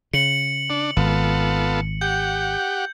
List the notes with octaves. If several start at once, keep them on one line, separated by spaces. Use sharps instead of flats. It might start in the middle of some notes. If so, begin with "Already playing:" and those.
C#3 C#7 F#7
D4
G#1 B3 F4 A4
G4 F#5 G6